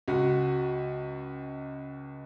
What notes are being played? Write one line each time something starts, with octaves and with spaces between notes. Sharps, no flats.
C#2 F#4